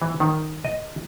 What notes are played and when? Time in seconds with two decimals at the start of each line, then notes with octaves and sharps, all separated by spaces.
0.02 E3
0.20 D#3
0.65 D#5